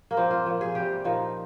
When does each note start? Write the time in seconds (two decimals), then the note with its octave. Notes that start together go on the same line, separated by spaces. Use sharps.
0.11 A#3
0.17 A#2 F3 C4
0.31 F4
0.46 A#2 F3
0.61 G#4
0.75 C3 G3 G4
1.04 A#2 F3 D#4